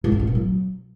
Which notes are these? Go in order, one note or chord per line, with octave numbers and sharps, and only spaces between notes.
G#2
E3
F3
A#2
F#3